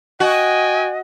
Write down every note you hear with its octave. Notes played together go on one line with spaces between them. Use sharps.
F#4 D#5 G5 G#5